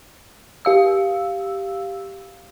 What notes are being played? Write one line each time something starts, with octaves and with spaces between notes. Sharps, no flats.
G4 F5 E6